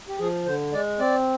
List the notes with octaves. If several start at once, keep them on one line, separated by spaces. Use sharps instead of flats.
G4
F3 G#4
D3 C5
G#3 D5
C4 D5